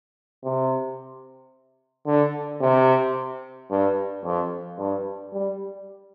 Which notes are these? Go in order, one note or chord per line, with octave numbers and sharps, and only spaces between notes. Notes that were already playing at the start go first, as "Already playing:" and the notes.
C3
D3
C3
G2
F2
G2
G3